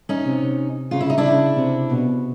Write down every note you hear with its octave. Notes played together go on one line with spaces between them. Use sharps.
C#4 D#4
C3
C#3 F4
E4
D#4
D4 E4
C#3
C3
B2